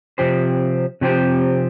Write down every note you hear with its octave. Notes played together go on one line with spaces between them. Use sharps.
C3 F3 C4 G4 C5
C3 F3 C4 G4 C5